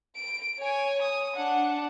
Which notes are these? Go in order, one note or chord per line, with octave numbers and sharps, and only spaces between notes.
D7
C#5 G#5
D#6
D4 F#5